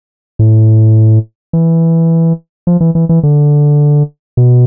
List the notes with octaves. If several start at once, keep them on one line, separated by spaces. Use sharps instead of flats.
A2
E3
F3
E3
E3
E3
D3
B2